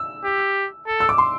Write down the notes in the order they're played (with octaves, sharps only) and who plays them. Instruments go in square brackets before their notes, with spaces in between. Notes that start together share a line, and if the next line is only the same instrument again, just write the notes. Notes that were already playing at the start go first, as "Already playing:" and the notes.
Already playing: [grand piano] E6
[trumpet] G4
A4
[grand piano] E6
D6
C6